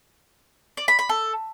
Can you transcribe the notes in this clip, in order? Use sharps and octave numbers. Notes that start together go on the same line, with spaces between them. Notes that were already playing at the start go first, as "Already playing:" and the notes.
D5
B5
B5
A4